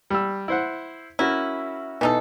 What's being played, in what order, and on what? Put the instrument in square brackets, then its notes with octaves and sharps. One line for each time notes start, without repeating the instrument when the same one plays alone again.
[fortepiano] G3 E6
E4 C5 F#5
[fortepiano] C#4 F#4 A#4 [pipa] E4
[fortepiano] B2 [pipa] E3 D#4 A4